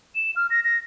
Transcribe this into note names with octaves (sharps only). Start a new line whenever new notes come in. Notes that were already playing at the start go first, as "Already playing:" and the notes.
E7
F6
A#6
A#6